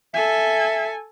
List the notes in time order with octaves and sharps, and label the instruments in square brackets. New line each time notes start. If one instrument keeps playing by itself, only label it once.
[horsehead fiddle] A4 G#5 [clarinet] E5